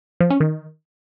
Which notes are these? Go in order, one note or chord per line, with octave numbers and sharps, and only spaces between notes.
F3
C#4
D#3